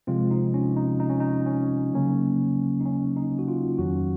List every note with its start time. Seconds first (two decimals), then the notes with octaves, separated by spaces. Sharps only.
0.07 C3 F3 G#3 C4 F4
0.31 D#4
0.54 C#4
0.77 D#4
1.00 D#4
1.10 C#4
1.20 D#4
1.46 C#4
1.93 C#3 F#3 A#3 C#4
2.81 D#4
2.85 C#4
3.17 D#4
3.39 F#4
3.48 F4
3.78 F2 D#3 F#3 C#4 F#4